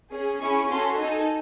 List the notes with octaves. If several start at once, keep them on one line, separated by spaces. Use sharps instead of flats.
C#4 G#4
C#4 E4 G#4 C#6
C#4 F#4 A4 C6
D#4 A4 G#5